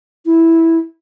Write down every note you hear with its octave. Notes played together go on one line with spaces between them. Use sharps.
E4